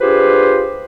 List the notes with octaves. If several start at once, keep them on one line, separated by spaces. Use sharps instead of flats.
D4 F4 G4 G#4 B4 C5